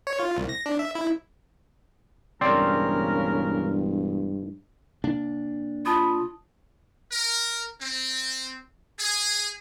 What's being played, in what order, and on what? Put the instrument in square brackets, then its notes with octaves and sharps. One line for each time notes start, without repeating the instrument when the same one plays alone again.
[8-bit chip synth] C#5
F4
C2
A#6
D4
E5
E4
[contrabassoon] E1 [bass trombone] G2 [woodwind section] C#3 A#4 [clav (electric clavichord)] C4 C5 D5
[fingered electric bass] C3 A#3 D4
[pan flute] F4 [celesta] A5 D#6 [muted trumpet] B5
[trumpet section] A#4
C4
G#4